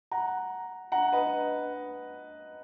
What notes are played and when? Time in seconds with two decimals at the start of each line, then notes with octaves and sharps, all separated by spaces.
0.12 F#5 A#5
0.92 F#5 A#5
1.13 B4 D#5